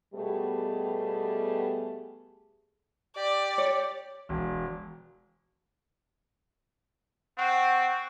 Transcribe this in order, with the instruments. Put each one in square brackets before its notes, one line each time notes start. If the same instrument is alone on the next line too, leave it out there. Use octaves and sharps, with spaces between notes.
[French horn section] B2 G3 A3 B3 G4 G#4
[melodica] G4 [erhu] D5
[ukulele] C#5
[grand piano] E1
[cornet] C4 [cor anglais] F#5 [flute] C#6